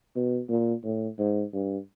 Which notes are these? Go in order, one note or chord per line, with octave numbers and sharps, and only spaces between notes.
B2
A#2
A2
G#2
G2